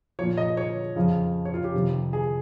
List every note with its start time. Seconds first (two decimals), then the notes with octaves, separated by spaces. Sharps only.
0.19 F3 C#5
0.23 A#2
0.37 D#5
0.57 C#5
0.96 F2 C#3 F3
1.45 C#5
1.54 F4
1.64 G4
1.74 F2 C3 D#3
2.13 G#4